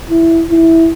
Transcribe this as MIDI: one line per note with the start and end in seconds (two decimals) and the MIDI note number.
0.10 0.43 64
0.50 0.91 64